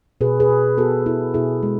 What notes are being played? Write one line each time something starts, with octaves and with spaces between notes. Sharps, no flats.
B2 G#4 B4
G#4 B4
B2
B3 F#4 A4
B3 E4 G#4
B2 E4 G#4
G#3